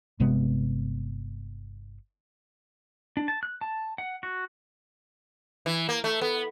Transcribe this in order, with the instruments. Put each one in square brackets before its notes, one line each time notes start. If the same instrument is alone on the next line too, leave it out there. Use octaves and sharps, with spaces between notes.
[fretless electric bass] G1 C3 G#3 B3
[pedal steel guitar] D4
A5
F#6
A5
F#5
F#4
[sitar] E3
A#3
A3
B3